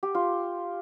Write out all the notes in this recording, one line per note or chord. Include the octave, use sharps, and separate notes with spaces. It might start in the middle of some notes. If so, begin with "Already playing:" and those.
G4
F4